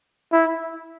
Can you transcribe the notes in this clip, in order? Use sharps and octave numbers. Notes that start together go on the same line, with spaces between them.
E4